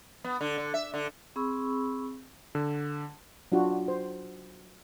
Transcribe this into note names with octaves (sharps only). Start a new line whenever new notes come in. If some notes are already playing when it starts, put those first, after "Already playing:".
B3
D3
D3
E5
D3
C4 G#4 B5 C#6 E6
D3
F#3 D4 F4 F#4
C5